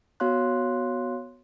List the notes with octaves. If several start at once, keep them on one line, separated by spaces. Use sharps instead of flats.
B3 F#4 C#5 F5 C6 F#6